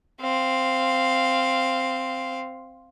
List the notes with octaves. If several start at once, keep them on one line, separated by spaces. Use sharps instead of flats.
C4 F5